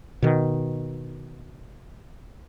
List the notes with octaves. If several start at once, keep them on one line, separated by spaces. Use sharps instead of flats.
B2 D#3